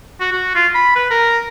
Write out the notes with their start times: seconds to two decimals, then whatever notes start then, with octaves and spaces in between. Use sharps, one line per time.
0.20 F#4
0.32 F#4
0.55 F4
0.74 B5
0.96 B4
1.10 A#4